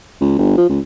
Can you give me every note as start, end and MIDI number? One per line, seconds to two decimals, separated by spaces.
0.21 0.34 37
0.38 0.56 31
0.58 0.67 53
0.70 0.80 37